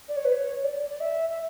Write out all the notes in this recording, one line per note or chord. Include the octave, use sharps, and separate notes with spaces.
D5
C#5
B4
C#5
D5
D5
E5
E5